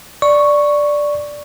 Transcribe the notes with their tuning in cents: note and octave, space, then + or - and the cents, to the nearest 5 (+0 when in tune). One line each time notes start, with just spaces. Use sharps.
D5 +0 C#6 +0